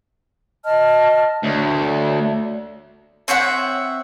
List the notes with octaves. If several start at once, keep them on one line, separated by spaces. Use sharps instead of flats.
D#5 A5 F6
D2 C#5
C4 C#5 E5 F#5